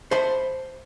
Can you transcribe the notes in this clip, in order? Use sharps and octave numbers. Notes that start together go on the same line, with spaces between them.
C5 E5 A5 B5 C6